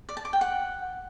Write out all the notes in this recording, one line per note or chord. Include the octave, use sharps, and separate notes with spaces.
D5
A5
D6
G5
F#5